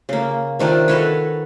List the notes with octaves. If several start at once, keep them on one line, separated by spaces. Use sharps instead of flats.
C#3 A#3
C3 D#3 D4 F4
F#4 A4 B4 C#5